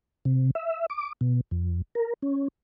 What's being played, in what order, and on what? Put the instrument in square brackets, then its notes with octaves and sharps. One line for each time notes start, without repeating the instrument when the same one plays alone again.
[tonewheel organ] C3
E5
D6
B2
F2
A#4
C#4